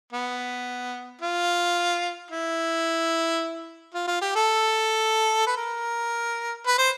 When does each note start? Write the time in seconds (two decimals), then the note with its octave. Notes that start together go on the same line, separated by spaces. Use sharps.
0.13 B3
1.21 F4
2.31 E4
3.94 F4
4.07 F4
4.21 G4
4.35 A4
5.47 B4
5.57 A#4
6.67 B4
6.78 C5